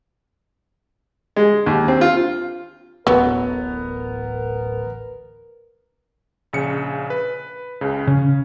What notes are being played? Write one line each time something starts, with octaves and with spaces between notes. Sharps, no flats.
G#3
D#2
C4
F4
D1 A1 F#3 B3 A#4
A#1 C#3 C#7
B4
C#2 C#3
C#3 C#4